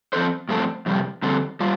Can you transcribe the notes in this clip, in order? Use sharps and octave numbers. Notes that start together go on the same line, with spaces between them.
F3 C4 A4 C5
G2 F3 A3 C4 A4
F2 C3 G3
F2 D3 G3 C4 A4
G3 F4